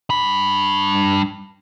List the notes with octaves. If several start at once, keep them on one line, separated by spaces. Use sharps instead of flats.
G2 B5